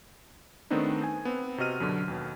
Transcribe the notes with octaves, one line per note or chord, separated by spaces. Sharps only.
D#3 A3 B3 C4 D4 D#4
G#5
B3 C4
C3 F#4 D#5 F6 D#7
F#2 B2 D3 F#3
D#2 B2